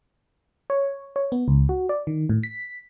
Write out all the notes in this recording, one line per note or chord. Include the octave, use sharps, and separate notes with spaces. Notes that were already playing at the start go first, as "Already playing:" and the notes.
C#5
C#5
B3
C#2
F#4
D5
D#3
A2
B6